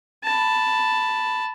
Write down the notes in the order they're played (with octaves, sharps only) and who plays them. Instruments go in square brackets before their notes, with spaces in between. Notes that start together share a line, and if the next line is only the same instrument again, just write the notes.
[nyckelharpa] A5 B5